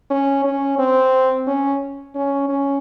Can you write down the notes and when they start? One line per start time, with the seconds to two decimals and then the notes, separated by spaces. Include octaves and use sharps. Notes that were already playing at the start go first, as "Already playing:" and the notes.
0.10 C#4
0.44 C#4
0.79 C4
1.47 C#4
2.15 C#4
2.49 C#4